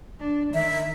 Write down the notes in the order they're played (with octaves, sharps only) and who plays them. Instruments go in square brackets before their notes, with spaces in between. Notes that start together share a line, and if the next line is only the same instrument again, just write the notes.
[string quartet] D4
[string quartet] D#3 [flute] E5